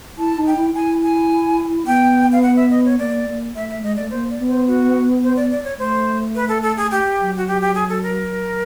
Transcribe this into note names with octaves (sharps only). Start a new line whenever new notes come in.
E4 A5
D#4
G5
E4
E4 G#5
G#5
B3 G5
F5
F#5
E5
D#5
C#5
A#3 D5
A#3
A3 E5
E5
G#3 D#5
A3 D5
A#3 C5
D5
B3
C5
F#4
C5
D5
D5
C#5
A3 C5
B4
A4
A4
G#4
G4
F#3
F#4
G4
G4
G#4
A4
A#4